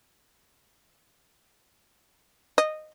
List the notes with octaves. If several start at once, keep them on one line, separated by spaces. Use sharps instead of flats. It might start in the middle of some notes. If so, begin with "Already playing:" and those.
D#5